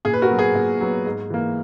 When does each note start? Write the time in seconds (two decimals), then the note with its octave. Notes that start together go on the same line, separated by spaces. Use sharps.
0.05 A#2 G#4
0.13 B4
0.22 F#4 A#4
0.30 F#3 B3
0.39 G#4
0.55 A#2
0.81 F#3 B3
1.06 G#2
1.30 E3 A#3